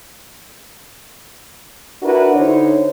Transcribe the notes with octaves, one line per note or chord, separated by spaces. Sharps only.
D4 E4 F#4 A#4 B4
D3 D#4 C5 C#5